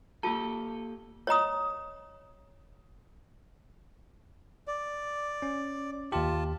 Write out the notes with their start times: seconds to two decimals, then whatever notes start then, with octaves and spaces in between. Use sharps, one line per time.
0.23 A#3 F4 G4 A4 A5
1.27 C#5 D#5 A#5 D#6
4.68 D5
5.42 C#4
6.12 D#2 F4 G4 A5